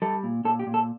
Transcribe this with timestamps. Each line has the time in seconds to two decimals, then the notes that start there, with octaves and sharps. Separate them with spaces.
0.02 G3 A4
0.23 A#2
0.45 A#2 A4
0.59 G4
0.67 A#2
0.74 A4